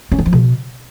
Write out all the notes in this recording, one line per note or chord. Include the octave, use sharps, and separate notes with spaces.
C#4
D#3
F3
B2